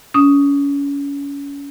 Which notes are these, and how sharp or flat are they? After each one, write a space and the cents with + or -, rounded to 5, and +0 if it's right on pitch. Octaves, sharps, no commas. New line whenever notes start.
C#4 +30 D#6 +0